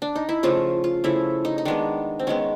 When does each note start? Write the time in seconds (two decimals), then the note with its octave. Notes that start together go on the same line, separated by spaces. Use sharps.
0.02 D4
0.15 D#4
0.29 E4
0.43 C#3 F3 A3 F4
0.84 F4
1.04 C#3 F3 A3 E4
1.45 D#4
1.58 D#4
1.65 D#3 G#3 B3 D4
2.19 C4
2.27 D#3 G#3 B3 C#4